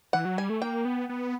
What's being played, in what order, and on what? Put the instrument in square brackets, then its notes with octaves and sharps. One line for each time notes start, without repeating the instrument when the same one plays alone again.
[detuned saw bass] E3 [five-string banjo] F#5
[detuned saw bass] F#3
[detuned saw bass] G3 [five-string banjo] G#5
[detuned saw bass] A3
[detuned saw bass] A#3 [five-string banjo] G5
[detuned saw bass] B3
B3